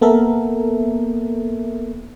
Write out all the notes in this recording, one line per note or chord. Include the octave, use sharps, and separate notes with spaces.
A#3 B3 A4 A#4 E5